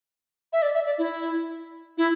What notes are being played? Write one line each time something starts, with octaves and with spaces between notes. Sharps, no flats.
E5
D5
E5
D5
E4
E4